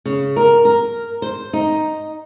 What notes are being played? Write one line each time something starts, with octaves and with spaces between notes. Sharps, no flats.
C#3
A#4
A#4
C5
D#4